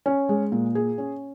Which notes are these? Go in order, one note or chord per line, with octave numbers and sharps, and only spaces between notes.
C#4
G#3
A#2
G#4
C#4